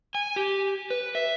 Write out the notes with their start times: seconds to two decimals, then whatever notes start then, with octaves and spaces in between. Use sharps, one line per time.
0.15 G#5
0.36 G4
0.90 B4
1.15 E5